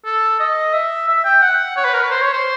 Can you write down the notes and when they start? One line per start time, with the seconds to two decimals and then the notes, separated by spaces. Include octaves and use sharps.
0.05 A4
0.40 D#5
0.73 E5
1.08 E5
1.24 G5
1.42 F#5
1.77 C#5
1.85 B4
1.93 A#4
2.02 B4
2.10 C5
2.22 C#5
2.33 C5